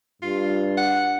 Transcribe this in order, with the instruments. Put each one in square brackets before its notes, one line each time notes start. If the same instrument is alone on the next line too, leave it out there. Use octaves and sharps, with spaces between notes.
[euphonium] G2 [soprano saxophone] F4
[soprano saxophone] F#5